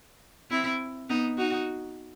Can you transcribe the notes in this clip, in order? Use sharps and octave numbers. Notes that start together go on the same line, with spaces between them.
C4 E4
B3 D#4
D#4 F#4